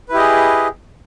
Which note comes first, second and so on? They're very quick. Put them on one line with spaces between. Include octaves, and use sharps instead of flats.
B4 E4 G4 D#5 G#4